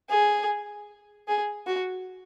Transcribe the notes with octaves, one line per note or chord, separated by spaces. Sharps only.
G#4
G#4
F#4